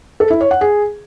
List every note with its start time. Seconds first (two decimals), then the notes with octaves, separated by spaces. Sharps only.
0.20 A4
0.30 E4
0.41 C#5
0.51 F#5
0.61 G#4